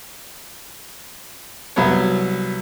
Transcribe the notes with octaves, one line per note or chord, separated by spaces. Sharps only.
C2 F#3 B3 C#5